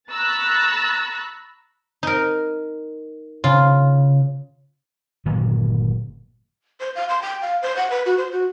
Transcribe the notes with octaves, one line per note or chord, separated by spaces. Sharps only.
A#5 B5 C#6 E6 F#6 A6
D#4 A#4
C#3 F4
G1 A#2 D#3 F#3
C5
F5
C6
G5
F5
C5
F#5
B4
F#4
C5
F#4